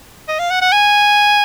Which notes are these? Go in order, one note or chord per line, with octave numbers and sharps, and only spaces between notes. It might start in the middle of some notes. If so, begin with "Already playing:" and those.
D#5
F5
F#5
F#5
G#5